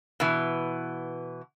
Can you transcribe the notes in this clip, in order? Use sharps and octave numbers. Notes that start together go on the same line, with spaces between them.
B2 E3